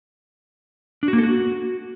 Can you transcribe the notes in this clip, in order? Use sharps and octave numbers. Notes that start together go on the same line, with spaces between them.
D4
F#4
A#3
A4
F#4